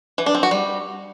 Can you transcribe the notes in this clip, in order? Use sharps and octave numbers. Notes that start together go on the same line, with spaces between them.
E3
D4
C4
F#4
G3